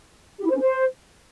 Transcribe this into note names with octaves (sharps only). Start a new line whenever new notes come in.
G4
E4
C5
C#4
C5